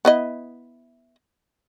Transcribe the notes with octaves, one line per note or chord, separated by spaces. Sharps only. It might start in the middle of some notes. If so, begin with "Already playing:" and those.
B3 E4 D#5